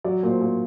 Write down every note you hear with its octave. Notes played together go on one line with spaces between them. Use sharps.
F#3 D5
A#2
C5
A#2